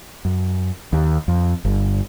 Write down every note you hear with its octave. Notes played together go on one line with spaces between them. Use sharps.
F#2
D#2
F2
G1